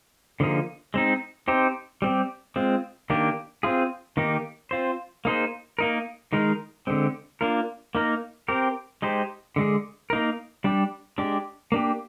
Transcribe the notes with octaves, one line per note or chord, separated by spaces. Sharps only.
D3 F3 A#3 D#4 G#4
G#3 C4 D#4
C4 D#4 G4 C5
G3 C4 G4
G#3 C4 F4
D#3 A#3 D4 G4
C4 F4 G#4
D#3 A#3 D#4 G4
C4 F4 C5
A#3 D#4 G#4 C5
A#3 D#4 A#4
D#3 G#3 D#4 A#4
D3 G#3 C4
A#3 D4 F4 A#4
A#3 D#4 A#4
C4 G4 A#4
G#3 D#4 G4 C5
D3 G#3 D4 G#4
A#3 D#4 A#4
G3 D4 G4
G#3 D4 G4
A#3 D4 G4